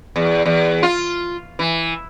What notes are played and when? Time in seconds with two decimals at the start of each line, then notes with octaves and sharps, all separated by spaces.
0.16 E2
0.46 E2
0.83 F4
1.59 E3